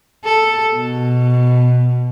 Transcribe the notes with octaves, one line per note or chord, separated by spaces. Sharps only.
A4
B2